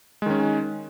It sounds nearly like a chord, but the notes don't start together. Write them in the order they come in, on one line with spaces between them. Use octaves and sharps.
G#3 D#3 C#4